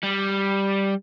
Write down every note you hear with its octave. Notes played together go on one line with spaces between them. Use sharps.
G3